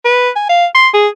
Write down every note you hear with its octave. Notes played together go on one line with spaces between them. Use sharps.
B4
G#5
F5
C6
G#4